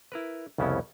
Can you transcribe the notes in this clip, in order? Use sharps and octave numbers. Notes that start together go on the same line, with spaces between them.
E4 A#4 B4
C2 F2 C#3 B3 C#4 E4